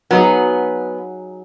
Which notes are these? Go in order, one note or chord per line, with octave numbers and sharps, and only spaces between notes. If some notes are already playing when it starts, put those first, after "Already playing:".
F#3 B3 D#4 G#4